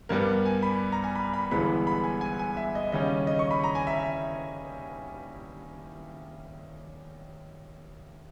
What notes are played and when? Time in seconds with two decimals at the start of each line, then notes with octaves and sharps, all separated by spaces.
0.09 G2 G3 B3 A#4
0.46 G#5
0.63 B5
0.92 A#5
1.04 G#5
1.15 B5
1.34 B5
1.51 G1 G2 E3 G#3 B3 B5
1.87 B5
2.04 G#5
2.21 G#5
2.39 G#5
2.57 E5
2.75 D#5
2.92 D#2 C#3 G3 C#4 D#5
3.27 D#5
3.39 C#6
3.51 B5
3.64 A#5
3.75 G#5
3.87 E5
3.99 E5